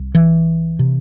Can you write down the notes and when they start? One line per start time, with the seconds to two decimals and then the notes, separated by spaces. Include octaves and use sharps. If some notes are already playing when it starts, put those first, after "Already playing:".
Already playing: C2
0.15 E3
0.79 C3